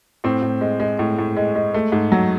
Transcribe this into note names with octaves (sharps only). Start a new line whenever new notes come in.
A2 C4
A2
G#3
G#3
A2
A2
G#3
G#3
A3
G#2
F#3